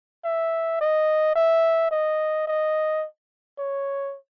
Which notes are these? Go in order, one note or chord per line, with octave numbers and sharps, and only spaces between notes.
E5
D#5
E5
D#5
D#5
C#5